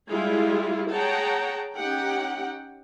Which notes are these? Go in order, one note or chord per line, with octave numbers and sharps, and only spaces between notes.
G3 G#3 E4 F4 G4 G#4
G#4 C#5 F#5 G5 A5 A#5
C#4 D#4 G4 F#5 G5